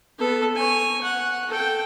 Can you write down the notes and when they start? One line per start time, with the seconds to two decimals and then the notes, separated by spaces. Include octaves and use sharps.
0.19 B3 A4
0.56 C#5 G#5
1.03 F#5
1.48 A4 G5